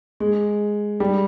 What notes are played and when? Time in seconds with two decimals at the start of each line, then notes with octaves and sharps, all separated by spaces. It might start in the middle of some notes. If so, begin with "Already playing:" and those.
0.20 G#3
1.00 G3